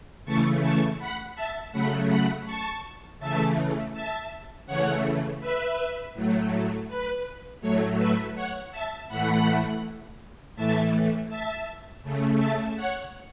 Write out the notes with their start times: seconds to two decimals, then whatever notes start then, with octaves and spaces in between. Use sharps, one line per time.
0.25 C#3 E3 A3 A5 C#6
0.61 A5 C#6
0.99 F#5 B5
1.35 E5 A5
1.72 C#3 F#3 A3 F#5 B5
2.09 F#5 B5
2.46 A5 C#6
3.19 C#3 E3 A3 E5 A5
3.93 E5 A5
4.67 C#3 E3 A3 C#5 F#5
5.40 B4 E5
6.14 A2 F#3 A3
6.88 B4
7.61 A2 F#3 A3 C#5
7.98 B4 E5
8.35 C#5 F#5
8.72 E5 A5
9.08 A2 E3 A3 F#5 B5
10.56 A2 E3 A3 E5 A5
11.29 E5 A5
12.03 C#3 A3
12.40 E5 A5
12.76 C#5 F#5